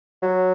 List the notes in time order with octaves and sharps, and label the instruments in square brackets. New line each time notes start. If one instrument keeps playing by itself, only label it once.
[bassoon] F#3